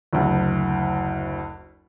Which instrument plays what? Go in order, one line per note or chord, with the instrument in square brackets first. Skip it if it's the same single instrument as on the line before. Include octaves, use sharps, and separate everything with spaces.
[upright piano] F#1 D2